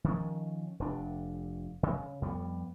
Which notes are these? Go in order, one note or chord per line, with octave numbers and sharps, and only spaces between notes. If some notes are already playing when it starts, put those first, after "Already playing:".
D#3 F3 C#4
F1 D4
C#3
F2 G3 G#3 B3